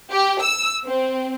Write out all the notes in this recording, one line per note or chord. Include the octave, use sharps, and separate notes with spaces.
G4
E6
C4